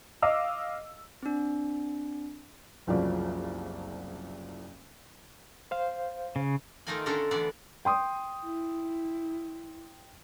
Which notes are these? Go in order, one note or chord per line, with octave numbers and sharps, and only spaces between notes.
D#5 F5 D6 E6
C4 D4
F#1 C2 C#3 F3 F#3 D5
C5 F5
C#3
D#3 A3 D#4 F4 A#4 G#5
D3 A3 C#4 D4 A4 A#4
D3 E3 B3 D4 E4 D5
G5 C6 D#6
E4